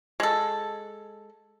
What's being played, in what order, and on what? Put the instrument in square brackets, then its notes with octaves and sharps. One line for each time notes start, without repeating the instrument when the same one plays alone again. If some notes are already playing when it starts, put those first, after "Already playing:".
[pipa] G#3 A4